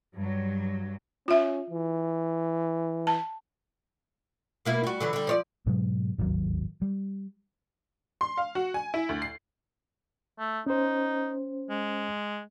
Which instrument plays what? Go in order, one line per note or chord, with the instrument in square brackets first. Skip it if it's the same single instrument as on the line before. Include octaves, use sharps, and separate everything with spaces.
[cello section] G2 F#3
[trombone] C#4 [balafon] F4 E5
[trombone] E3
[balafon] A5
[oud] B2 A#3 E4
G3 F#4
D3 E3 F#3
D3 G3
F3 C#5 D5
[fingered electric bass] G#2 B2 F#3 G#3
D1 G#1 D#2 F#3
G3
[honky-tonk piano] C6
F5
F#4
G#5
E4
D2
C7
[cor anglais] A3
[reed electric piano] C#4 C5 [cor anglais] D#4
[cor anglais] G#3